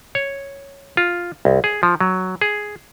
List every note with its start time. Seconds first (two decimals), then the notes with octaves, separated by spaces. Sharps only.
0.15 C#5
0.97 F4
1.45 C2
1.64 G#4
1.83 F3
2.01 F#3
2.41 G#4